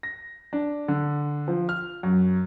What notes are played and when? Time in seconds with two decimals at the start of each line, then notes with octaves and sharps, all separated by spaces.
0.03 A#6
0.53 D4
0.88 D3
1.48 F3
1.69 F6
2.03 F#2